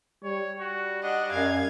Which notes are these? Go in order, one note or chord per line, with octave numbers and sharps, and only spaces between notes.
G3 C#5
F#4
D4 D#5 F#5
F#2 F5 G#6